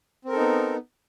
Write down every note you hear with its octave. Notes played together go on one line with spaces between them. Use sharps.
B3 C4 D#4 A4 A#4